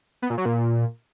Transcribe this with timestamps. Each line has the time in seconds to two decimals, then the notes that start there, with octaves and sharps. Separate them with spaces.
0.22 B3
0.30 A#2
0.38 F#3
0.46 A#2